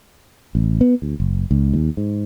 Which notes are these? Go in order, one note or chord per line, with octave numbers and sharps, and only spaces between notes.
A1
B3
D2
F#1
C#2
D#2
G#2